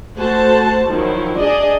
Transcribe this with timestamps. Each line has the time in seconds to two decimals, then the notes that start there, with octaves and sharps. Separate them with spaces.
0.17 A3 F#4 C5 A5
0.87 D#3 F3 F#3 E4
1.37 D4 G#4 D5 D#5